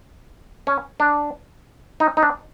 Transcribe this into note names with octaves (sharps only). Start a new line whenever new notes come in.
C#4
D4
D#4
D#4
D4